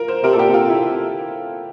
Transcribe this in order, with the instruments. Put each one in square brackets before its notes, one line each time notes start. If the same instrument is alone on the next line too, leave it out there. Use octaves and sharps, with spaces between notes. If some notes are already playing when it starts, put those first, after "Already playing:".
Already playing: [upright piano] F4 A#4
C5
[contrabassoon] C3 [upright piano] A#4
[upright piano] A4
[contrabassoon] A#2 [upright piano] G4
[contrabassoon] C3 [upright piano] F4
[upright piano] E4